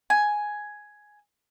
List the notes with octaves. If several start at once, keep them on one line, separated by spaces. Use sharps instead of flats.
G#5